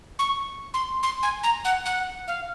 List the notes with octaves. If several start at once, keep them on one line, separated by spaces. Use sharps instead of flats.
C#6
C6
C6
G#5
A#5
F#5
F#5
F5